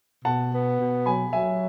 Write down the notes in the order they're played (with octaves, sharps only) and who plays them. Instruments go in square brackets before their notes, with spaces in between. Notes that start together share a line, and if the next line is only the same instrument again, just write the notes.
[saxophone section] B2 [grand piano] F#5 A5
[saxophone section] B3
B2
[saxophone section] F#3 [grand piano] G#5 B5
[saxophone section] F#3 [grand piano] E5 G#5